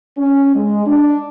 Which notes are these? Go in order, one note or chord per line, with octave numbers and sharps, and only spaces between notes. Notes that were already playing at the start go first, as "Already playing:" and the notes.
C#4
G#3
D4